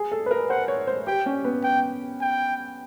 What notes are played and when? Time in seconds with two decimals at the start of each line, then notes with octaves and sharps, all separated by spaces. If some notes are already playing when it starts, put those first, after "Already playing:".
Already playing: G#4
0.12 A4
0.26 B4
0.31 A#4
0.49 C5 F#5
0.68 C#5
0.87 C5
1.07 G4 G5
1.26 C#4
1.45 B3
1.64 G5
2.21 G5